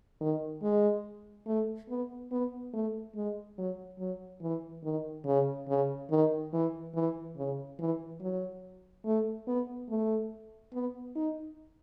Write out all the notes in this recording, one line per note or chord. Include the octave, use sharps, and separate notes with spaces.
D#3
G#3
A3
B3
B3
A3
G#3
F#3
F#3
E3
D#3
C#3
C#3
D#3
E3
E3
C#3
E3
F#3
A3
B3
A3
B3
D#4